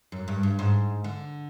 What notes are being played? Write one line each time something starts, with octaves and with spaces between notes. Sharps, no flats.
F#2
G2
G2
G#2
D3